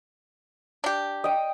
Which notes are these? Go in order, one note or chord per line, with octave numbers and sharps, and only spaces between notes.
D4 G4
D#5 G5